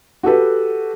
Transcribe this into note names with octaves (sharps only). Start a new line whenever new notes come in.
F#4 G4 A4 B4